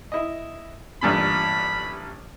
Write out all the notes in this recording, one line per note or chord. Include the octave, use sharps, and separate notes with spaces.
E4 D#5
A1 G2 A#2 B5